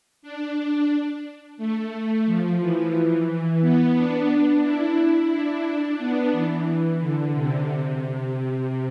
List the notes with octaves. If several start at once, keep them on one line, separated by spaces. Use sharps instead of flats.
D4
A3
F3
E3
E3
B3
D4
E4
D4
D4
B3
E3
D3
C3
C3